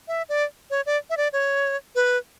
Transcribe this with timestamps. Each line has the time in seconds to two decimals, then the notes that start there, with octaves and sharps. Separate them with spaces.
0.08 E5
0.29 D5
0.70 C#5
0.86 D5
1.10 E5
1.17 D5
1.33 C#5
1.95 B4